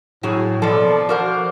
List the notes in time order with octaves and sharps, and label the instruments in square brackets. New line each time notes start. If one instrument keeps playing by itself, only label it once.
[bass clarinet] A2 [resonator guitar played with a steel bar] F#3 F#4 G#4
[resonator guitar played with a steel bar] B2 A#3 A4 [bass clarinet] F3 [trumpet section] D5
[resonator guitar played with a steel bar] F#4 A#4 C5 [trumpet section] F5 F#5 D6